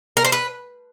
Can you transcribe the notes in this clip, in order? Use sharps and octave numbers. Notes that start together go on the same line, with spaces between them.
A#4
C5
B4